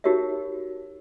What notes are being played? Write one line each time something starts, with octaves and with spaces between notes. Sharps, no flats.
D#4 F#4 G4 A#4 C#5 E5